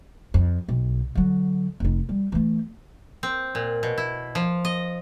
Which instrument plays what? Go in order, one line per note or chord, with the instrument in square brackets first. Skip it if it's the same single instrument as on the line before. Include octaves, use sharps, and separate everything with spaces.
[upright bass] F2
B1
D3 F#3
F1 D#4
G3
E3 A3
[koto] C4
A#2
B2
E4
F3
D#5